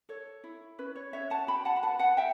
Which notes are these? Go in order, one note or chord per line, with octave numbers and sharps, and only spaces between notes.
A4 C#5
E4
C#4 B4
C#5
C#4 C#5 E5
F#5 A5
F#4 G5 B5
F#5 A5
B5
B4 F#5 A5
F#5 A5
E5 G5